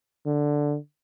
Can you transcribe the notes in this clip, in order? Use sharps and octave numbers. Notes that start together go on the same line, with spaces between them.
D3